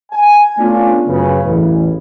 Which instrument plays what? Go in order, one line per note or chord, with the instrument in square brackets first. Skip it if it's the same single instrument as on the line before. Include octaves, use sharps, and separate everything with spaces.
[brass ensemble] G#5
A3 B3 C#4 D4 F4
F#2 C#3 B4
A1 E2 A2